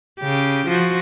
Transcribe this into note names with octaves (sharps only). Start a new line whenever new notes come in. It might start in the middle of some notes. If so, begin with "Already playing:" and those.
C#3 G4
F3 F#4